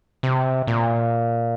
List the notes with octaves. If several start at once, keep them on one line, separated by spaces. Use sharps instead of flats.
C3
A#2